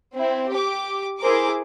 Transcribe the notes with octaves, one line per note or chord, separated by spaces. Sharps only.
C4 E4
G4 D6
E4 G#4 A#4 C5 D6